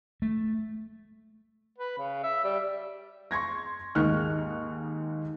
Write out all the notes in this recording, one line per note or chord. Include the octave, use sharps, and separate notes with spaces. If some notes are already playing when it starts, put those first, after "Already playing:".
A3
B4
C#3
E5
G3
C6 C#6 G#6 A#6
D#2 G#2 G#3 C#6 F6 F#6